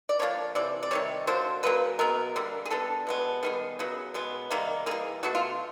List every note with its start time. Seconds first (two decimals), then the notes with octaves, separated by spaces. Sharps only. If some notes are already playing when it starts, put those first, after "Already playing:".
0.09 D5
0.19 D3 F3 A#3 C#5
0.55 C3 E3 D5
0.83 D5
0.91 C3 D#3 G3 C#5
1.27 D3 F#3 A#3 C5
1.63 C#3 F#3 A#3 B4
1.99 B2 F#3 B3 A#4
2.36 D3 G3 A#3
2.65 G#4
2.70 D3 G3 B3 A4
3.07 B2 G#3 B3
3.43 D#3 G3 B3 G#4
3.79 C#3 F#3 B3
4.14 B2 G#3 B3
4.50 C3 D#3 G3 A#3
4.86 E3 G3 A#3 G#4
5.23 B2 F#3 A3 F#4
5.35 F4